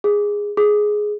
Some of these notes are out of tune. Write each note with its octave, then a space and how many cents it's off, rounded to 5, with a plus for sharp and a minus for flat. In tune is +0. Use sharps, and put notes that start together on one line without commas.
G#4 -10
G#4 +10